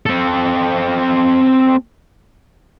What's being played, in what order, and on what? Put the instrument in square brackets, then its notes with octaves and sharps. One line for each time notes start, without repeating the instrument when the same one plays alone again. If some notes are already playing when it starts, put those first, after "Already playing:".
[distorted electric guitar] C4 A4